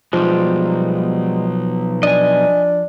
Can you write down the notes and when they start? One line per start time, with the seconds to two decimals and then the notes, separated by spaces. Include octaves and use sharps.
0.13 B1 F3 G3 G#3
2.03 D4 D#5 G#5